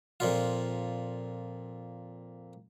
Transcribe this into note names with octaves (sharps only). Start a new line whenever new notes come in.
F2 A#2 F4